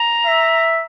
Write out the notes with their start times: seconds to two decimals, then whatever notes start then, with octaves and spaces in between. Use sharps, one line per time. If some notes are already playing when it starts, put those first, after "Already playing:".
Already playing: A#5
0.26 E5